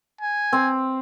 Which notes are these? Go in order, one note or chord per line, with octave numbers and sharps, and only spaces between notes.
G#5
C4